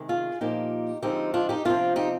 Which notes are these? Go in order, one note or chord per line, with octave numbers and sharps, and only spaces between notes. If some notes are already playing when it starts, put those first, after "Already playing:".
Already playing: C3 D#3 G#3
F4 G#4
A#2 F3 A#3 D#4 G4
D3 F3 G#3 C4 D#4 G4
D4 F4
D#4 G4
C3 F3 C4 D4 F4
D#4 G4